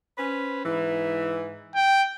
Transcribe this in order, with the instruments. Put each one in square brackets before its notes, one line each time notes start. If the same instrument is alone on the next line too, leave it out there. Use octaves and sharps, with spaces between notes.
[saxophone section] C#4 B4 C5
G#2 E3
[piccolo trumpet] G5